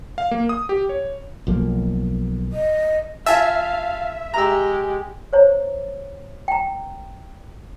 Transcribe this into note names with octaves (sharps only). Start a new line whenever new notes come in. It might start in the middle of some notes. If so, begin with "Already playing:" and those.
F5
A#3
D#6
G4
C#5
B1 F3 A#3
D#5
F4 E5 F5 G#5 A5
G#3 G4 A#5 E6
C5 C#5 A#5
G5 A#5